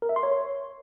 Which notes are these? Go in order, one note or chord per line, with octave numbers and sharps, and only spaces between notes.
A#4
E5
C6
C#5